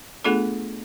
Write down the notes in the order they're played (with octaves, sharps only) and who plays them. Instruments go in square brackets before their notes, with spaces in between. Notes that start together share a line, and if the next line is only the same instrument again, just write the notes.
[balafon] A3 B3 D4 F4 G#4 A4